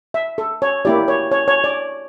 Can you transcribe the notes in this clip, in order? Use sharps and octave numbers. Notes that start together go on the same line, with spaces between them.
E5
A4
C#5
A#3 E4 G4 D5
C#5
C#5
C#5
D5